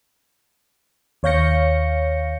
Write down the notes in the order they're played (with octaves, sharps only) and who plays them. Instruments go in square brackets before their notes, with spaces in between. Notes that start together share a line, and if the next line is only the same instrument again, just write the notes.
[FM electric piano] D#2 C#5 F5 G6 A#6 C#7